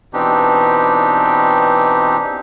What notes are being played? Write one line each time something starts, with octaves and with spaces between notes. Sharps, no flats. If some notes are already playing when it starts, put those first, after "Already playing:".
B2 E3 C4 D4 D#4 G4